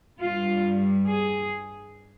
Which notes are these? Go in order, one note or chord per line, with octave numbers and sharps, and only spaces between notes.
G2 G3 F4
G#4